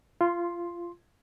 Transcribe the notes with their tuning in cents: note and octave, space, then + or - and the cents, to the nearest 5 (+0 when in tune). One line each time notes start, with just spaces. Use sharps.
F4 -20 C6 +5